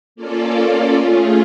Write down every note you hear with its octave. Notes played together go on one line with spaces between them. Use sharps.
A#3 C#4 F4 A4 D5
A3 C#4 F4 G#4